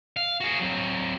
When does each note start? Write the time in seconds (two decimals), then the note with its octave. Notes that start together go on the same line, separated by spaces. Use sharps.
0.17 F5
0.41 F#4 G#4
0.60 F#3 C4